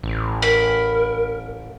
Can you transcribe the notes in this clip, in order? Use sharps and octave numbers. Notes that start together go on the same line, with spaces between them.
A1
A#4 B5